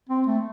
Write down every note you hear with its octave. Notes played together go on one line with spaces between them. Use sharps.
C4
A3